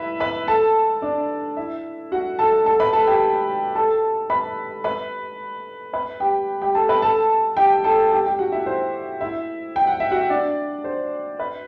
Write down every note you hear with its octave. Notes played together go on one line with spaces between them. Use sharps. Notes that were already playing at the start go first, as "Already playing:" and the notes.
Already playing: E4 B4 E5 B5
B4 B5
A4 A5
D4 D5
E4 E5
F#4 F#5
A4 A5
A4 A5
B4 B5
A4 A5
G4 G5
A4 A5
B4 B5
B4 B5
B4 B5
G4 G5
G4 G5
A4 A5
B4 B5
A4 A5
G4 G5
A4 A5
G4 G5
G4 G5
F#4 F#5
E4 E5
C5
E4 E5
G5
F#5
E5
F#4 F#5
D4 D5
C5
B4